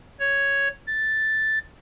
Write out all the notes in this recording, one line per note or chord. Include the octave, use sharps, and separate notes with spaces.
C#5
A6